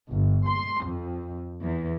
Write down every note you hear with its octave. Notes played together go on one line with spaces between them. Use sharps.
G1
C6
F2
E2